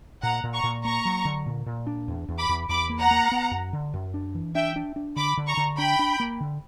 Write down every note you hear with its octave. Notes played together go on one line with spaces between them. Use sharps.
A#2 F#5 A#5
A#2
A#5 C#6
A#2
A#3 A#5 C#6
F#3
D3
A#2
A#2
D4
E2
E2
B5 D6
E2
E2 B5 D6
A#3
F#5 A#5
A#3
B3
F#2
D3
F#2
D4
E3
D4 E5 G5
D4
D4
D3 B5 D6
D3
A#5 C#6
D3
D4 G5 B5
D4
A#3
D3